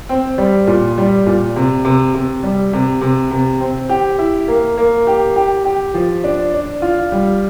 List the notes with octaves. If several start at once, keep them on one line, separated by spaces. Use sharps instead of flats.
C4
G3
A#2
G3
A#2
C3
C3
C3
G3
C3
C3
C3
C4
G4
E4
A#3
A#3
G4
G4
G4
F3
D4
D4
F4
G3